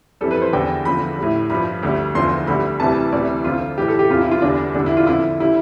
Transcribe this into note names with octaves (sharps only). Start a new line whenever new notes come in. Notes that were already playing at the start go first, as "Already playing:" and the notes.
F2 E3 G3 A4
B4
C5
E2 D3 G3 G5
E2 D3 F3 B5
A2 G3
G2 F3 B5
D2 D3 G3
E2 D3 F3 C6
D2 D3 G3 B5
D2 C3 E3 G3 A5
D2 C3 E3 G3 D5
F2 D3 F3 F4
A2 E3 G3 G4
A4
G4
E2 C3 E3 G3 F4
E4
F4
E2 D3 G3 D4
E2 D3 G3 D4
E4
F4
F2 D3 F3 E4
D3 G3 E4